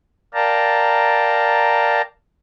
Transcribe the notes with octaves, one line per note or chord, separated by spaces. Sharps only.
A#4 D5 F5 G5 A5 A#5